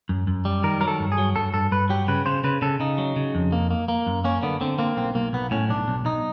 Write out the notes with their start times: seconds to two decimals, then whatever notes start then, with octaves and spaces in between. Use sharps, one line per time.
0.09 F#2
0.27 F#2
0.45 G3
0.63 D#3 A#4
0.81 F#3 A#4
0.88 A4
1.00 G2
1.12 G#4
1.18 F#3
1.36 G2 A4
1.54 G2 A4
1.72 G2 B4
1.89 F#3 G4
2.08 C#3 B4
2.26 C#3 C5
2.44 C#3 B4
2.62 C#3 A4
2.80 C#3 D#4
2.98 F#3
3.16 C#3
3.35 F2
3.52 A#3
3.71 A#3
3.88 A#3
4.06 F#2
4.24 A#3 C#4
4.43 D3 B3
4.61 D3 C4
4.79 A#3 C4
4.97 B1 C4
5.15 B1 A#3
5.33 B1 B3
5.51 A2 C#4
5.69 B1 D4
5.88 B1
6.05 B1 D#4